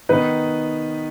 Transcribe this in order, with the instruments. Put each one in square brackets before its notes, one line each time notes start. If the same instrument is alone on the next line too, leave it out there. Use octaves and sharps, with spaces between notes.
[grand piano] D#3 B3 D#4 B4